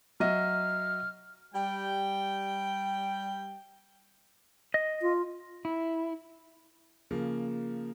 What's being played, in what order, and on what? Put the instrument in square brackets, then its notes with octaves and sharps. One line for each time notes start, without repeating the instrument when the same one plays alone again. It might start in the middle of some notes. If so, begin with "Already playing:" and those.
[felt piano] F#3 D#5 E5 [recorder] F6
[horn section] G3 G5
[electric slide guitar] D#5
[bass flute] F4
[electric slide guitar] E4
[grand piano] C#3 F3 A#3